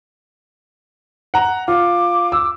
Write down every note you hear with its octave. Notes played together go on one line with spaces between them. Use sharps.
F#5 A#5
F4 D6
E6